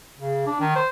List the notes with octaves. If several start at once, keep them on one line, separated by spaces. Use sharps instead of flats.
C#3
D4
D#3
C5